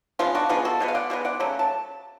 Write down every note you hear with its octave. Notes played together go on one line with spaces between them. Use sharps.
F3 G#3 B3 C#4 F4
D4 F#4
F3 G#3 B3 F4 G#4
F#4 A4
B2 G#3 B3
F5
D5 F#5
B2 G#3 B3
D5 F#5
C#3 F#3 A3
A5